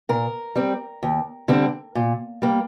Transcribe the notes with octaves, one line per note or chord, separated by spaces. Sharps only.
A#2 A#4
G3 C4
D#2
D3 G3 C4
A#2
G3 A#3